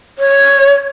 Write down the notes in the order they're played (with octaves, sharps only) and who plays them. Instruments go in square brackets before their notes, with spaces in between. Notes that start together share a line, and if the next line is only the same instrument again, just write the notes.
[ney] C#5